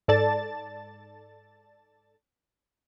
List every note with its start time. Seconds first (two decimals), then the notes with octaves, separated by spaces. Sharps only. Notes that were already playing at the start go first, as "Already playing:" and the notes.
0.08 G#2 A4 D5 A5 A6